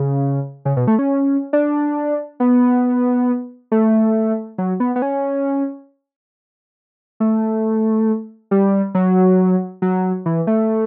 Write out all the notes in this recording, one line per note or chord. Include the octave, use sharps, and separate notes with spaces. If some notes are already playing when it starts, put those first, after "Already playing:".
Already playing: C#3
C#3
B2
A3
C#4
D4
B3
A3
F#3
B3
B3
C#4
A3
G3
F#3
F#3
E3
A3